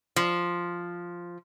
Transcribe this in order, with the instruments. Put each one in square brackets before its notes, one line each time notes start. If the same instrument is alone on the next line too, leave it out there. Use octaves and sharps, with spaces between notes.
[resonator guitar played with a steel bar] F3